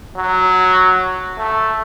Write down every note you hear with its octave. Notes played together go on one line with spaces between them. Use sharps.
F#3
A3